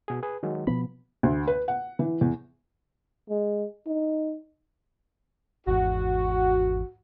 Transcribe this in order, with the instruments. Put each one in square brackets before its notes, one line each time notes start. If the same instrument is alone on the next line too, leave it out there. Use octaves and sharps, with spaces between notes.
[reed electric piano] B2 G#4
G#4 B4
D#3 F#3 G#3
[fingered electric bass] B2 F3 B3 [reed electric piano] B5
[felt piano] D2
B4
F#5
E3
E2
[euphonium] G#3
D#4
[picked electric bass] G#1 E2 G#2 [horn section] F#4